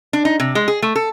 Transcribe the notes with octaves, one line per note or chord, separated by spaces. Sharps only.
D4
D#4
C3
G#3
G#4
A3
A4